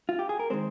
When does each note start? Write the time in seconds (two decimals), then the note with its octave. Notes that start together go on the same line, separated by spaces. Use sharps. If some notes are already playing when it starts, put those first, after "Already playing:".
0.09 F4
0.19 G4
0.29 G#4
0.39 A#4
0.50 D#3 G#3 C4 C5